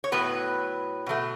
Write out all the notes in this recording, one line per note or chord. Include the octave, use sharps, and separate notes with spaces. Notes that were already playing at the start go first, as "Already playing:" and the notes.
C#5
A2 F#3 B3 B4
B2 F#3 A3